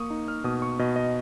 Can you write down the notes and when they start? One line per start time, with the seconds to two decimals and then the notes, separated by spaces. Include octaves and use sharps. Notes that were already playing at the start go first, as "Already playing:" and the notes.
Already playing: A#3 C#6 D#6
0.10 D#4
0.28 F6
0.44 B2 D#6
0.62 C#6
0.79 B2 D#5
0.96 D#5